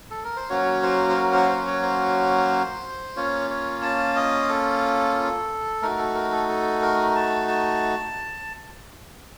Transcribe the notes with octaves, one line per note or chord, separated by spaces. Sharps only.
A4
A#4
C5
F#3 A#3 C#4 F#4 C#5
C5
C5
A#4
C5
C5
C#5
C5
A#3 C#4 F4 C#5
C#5
A5
D#5
A4
A3 D#4 F#4 A#4
A4
A#4
A4
A4
A#4
A5
A5